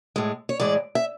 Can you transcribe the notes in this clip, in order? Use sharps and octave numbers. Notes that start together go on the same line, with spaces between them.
A2 G#3
C#5
A2 E3 G#3 D5
E5